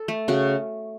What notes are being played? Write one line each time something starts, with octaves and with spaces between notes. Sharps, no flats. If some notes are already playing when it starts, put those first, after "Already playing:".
Already playing: A4
A3
C#3 F#4